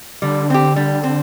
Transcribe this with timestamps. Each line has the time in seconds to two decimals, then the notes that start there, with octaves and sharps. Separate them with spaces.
0.22 D3 G3
0.50 C4 G4
0.76 G3
1.04 C4